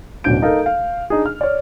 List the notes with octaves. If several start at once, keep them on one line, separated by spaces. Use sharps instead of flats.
D1 B2 C#4 D4 G6 D7
D#4 A4 A#4 F5
F5
D4 D#4 G#4
F6
C#5 D5